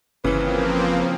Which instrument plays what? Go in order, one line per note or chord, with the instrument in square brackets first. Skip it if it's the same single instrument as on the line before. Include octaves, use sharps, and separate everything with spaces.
[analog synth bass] G1 [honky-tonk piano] C#3 E3 [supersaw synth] F3 A#3 C4 [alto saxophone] B4